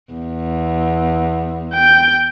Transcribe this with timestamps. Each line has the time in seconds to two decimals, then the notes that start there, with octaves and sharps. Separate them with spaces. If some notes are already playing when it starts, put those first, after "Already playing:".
0.13 E2
1.74 G5